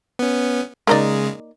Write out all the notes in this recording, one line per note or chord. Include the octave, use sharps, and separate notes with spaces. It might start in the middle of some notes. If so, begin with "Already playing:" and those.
B3 C#4
C#3 G#3 A#3 D#4 D5